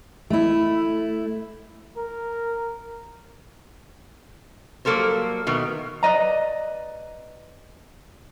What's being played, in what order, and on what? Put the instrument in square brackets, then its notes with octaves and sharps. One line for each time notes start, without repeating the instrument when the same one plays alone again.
[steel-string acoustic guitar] A3 E4
[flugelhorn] A#4
[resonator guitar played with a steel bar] F#3 G3 A#3 A4 A#4 C5
B2 D#3 A3 A#4
[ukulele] B4 D5 D#5 A#5